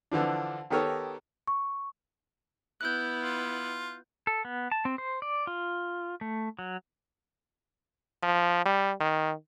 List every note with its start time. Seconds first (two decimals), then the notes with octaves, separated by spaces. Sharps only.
0.11 D3 E3 F3 D4
0.70 D#3 B3 G4 A4 A#4 C#5
1.47 C#6
2.81 B3 E4 F#6 G6
3.23 F4
4.27 A4
4.45 B3
4.72 A5
4.85 C4
4.98 C5
5.22 D5
5.47 F4
6.21 A3
6.59 F#3
8.23 F3
8.66 G3
9.00 D#3